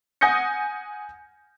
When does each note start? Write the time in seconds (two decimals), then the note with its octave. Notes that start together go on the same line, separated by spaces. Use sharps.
0.21 F#5 G#5 D#6 G6 A#6 C#7